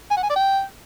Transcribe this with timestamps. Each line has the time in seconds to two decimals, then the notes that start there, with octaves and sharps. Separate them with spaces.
0.10 G#5
0.17 F#5
0.23 G#5
0.29 D5
0.36 G5